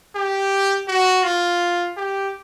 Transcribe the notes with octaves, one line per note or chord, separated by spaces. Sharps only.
G4
F#4
F4
G4